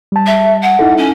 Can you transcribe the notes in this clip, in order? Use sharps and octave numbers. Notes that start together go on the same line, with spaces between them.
G3 A5
E5
F#5
D#4 E4 A4
C#4